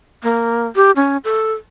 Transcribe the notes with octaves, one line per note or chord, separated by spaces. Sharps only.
A#3
G4
C#4
A4